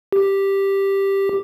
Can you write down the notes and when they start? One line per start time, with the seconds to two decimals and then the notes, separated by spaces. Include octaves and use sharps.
0.13 G4